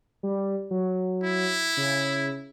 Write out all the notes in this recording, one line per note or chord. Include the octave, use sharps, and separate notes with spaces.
G3
F#3
E4
C#3